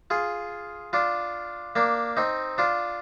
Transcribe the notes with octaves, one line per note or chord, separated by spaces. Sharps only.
F4 G#4
D4 F4
A#3 D4
C4 D#4
D4 F4